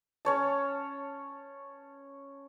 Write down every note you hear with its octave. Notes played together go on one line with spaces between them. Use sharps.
C#4 C#5 A5